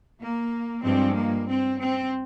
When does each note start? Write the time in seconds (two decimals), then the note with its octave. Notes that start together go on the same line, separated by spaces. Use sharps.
0.20 A#3
0.83 G2 F3 G#3 C4
1.16 A#3
1.47 C4
1.80 C4